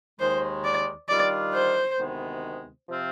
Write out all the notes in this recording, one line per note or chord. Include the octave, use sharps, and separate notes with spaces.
D#2 D#3 G#3 C5
D5
D#3 G3 D4 F4 D5
C5
D2 C3 D#3 G#3 B3
C3 F3 C4 F4